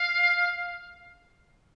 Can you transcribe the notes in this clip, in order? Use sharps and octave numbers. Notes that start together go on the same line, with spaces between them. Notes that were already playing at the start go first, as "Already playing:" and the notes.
Already playing: F5